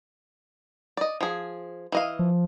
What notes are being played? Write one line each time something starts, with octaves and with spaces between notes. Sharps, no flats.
D5 D#5
F3 G#4
E3 D#5 F5
F3